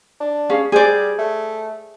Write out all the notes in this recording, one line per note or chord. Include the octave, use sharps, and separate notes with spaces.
D4
C#4 G#4 F5
G3 G#4 C5 D5
A3